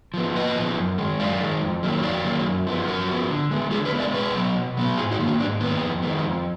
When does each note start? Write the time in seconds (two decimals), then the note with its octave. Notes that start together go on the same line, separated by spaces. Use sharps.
0.14 F3 B3
0.35 A#2 B4 D#5
0.56 F3 B3
0.77 F#2
0.98 D#3 G#3
1.19 F#2 D5 F5
1.41 D#3 G#3
1.62 F2
1.83 D#3 F#3 A#3
2.03 F2 D5 F5
2.24 D#3 F#3 A#3
2.45 F#2
2.67 F3 B3
2.88 F#2 F#4 A#4
3.08 F3 B3
3.30 D3
3.51 G#3 B3
3.71 D3 F4 G#4
3.85 G#4 B4
3.92 G#3 B3
3.99 A#4 D5
4.13 B2 G#4 B4
4.35 F#3 B3
4.55 B2
4.77 F#3 B3
4.97 G#2 F4 G#4
5.11 D#4 F#4
5.19 D#3 A#3
5.26 D4
5.39 G#2 D4
5.60 D#3 A#3 B3
5.81 F2
6.02 D#3 G#3 B3
6.24 F2